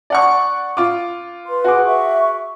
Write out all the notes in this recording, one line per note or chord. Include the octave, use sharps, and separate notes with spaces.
D5 F#5 C#6
F4 D6
B4 C6
F#4 G#4 D6
E5 C#6